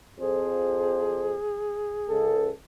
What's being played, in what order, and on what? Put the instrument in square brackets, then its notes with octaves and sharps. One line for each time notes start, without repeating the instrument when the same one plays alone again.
[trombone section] F2 C5 [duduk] G#4
[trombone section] C#2 A4